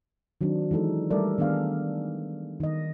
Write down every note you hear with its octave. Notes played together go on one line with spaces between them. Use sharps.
D#3 F#3 C4 D4
E3 G#3 D#4 A4
G3 A3 A4 A#4 D5 E5
D#3 B3 D4 G#4 F5
D#3 D#5